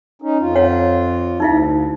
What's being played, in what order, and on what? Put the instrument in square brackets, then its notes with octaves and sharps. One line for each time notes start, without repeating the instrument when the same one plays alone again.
[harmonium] C#4 D#4
F2 F4
[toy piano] C#5 F5 F#5
[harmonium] D2 [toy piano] D#4 E4 F5